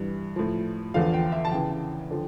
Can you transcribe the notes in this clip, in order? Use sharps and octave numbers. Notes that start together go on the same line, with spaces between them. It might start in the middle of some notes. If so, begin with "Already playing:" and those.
Already playing: G2 E3
A2 F3
E2 D3 F3 F5
G5
E5
A5
E2 C#3 E3 G5
D3 F3